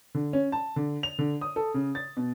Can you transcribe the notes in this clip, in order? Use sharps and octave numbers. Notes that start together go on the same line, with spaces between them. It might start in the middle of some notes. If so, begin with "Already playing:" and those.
D3
C#4
A5
D3
F7
D3
D#6
A4
C#3
A6
B2